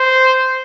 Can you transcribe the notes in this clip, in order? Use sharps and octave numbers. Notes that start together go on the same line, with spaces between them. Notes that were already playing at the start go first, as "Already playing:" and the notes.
Already playing: C5